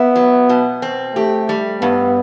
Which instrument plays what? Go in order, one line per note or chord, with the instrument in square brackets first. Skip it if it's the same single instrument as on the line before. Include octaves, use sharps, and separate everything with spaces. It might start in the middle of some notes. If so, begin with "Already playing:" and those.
Already playing: [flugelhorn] B3 [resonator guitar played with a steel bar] E4
[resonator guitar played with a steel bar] F#3
B2
C4
[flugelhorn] A3 [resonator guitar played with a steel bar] G4
[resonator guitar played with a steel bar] G3
[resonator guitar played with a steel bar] G2 [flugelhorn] B3